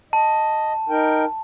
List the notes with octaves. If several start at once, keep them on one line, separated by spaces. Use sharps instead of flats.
D#5 A5
D#4 A#4 G5